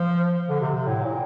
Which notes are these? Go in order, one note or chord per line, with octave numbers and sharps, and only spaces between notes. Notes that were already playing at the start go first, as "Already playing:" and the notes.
Already playing: F3
D3
C3
C3
A2
A#2